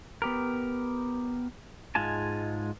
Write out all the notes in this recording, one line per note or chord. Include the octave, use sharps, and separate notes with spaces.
B3 G4 A#4
G#2 G#3 F4 G#5 A5